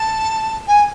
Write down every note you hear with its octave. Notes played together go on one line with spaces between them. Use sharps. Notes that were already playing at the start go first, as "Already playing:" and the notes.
Already playing: A5
G#5